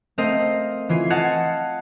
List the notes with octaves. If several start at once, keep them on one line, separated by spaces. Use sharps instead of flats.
A3 C4 A#4 D#5 F5
E3 F4 G#5 C7
D#5 F5 F#5 A5 G#6 C#7